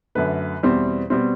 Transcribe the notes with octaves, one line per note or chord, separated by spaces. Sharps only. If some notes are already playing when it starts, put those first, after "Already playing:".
F#2 D3 A3 B4
E2 B2 G3 C4
B2 G3 C4